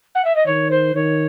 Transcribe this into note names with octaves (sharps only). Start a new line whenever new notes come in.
F#5
E5
D#5
D#3 C#5
C5
D#3 C#5